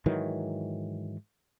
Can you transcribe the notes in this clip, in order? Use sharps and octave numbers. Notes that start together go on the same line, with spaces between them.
G#2 D#3 E3 F#3